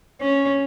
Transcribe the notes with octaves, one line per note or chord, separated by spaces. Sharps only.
C#4